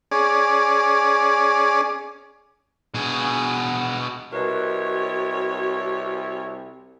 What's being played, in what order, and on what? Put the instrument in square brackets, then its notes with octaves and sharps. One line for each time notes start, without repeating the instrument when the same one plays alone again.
[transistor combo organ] C#4 G#4 D5
[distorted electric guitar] B2 G#4
[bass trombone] C2 [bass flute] F#4 [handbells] A#4 B4 D#5 [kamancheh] C#5